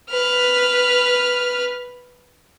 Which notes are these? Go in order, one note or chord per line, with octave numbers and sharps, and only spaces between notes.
B4 F6